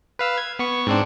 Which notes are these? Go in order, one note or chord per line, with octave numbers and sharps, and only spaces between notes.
B4 F5 E6
G#6
B3 C#6
G#2 C4 D4